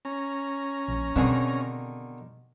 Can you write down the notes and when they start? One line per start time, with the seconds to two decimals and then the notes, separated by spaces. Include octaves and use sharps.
0.05 C#4 A#5
0.88 A#1
1.16 B2 D3 D#3 C4 G#4